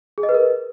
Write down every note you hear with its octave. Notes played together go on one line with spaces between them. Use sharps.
G#4
D#5
B4
A#4